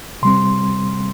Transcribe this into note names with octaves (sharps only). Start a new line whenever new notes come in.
C3 G3 C4 C6